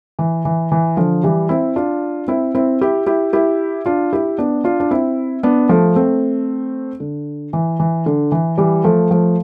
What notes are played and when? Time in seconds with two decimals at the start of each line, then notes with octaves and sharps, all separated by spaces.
0.19 E3
0.45 E3
0.72 E3
0.97 D3 F3
1.23 E3 G3
1.49 C4 E4
1.76 D4 F4
2.28 C4 E4
2.55 C4 E4
2.81 E4 G4
3.07 E4 G4
3.33 E4 G4
3.86 D4 F4
4.13 E4 G4
4.38 B3 D4
4.64 D4 F4
4.80 D4
4.91 C4 E4
5.43 B3 D4
5.69 F3 A3
5.95 A3 C4
7.00 D3
7.53 E3
7.80 E3
8.06 D3
8.32 E3
8.58 E3 G3
8.84 F3 A3
9.11 F3 A3